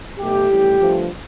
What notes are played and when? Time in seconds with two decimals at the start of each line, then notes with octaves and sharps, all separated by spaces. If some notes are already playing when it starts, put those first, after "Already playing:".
0.18 B1 B2 A3 G4
0.48 A1 A2 G3
0.79 G2 F3 A3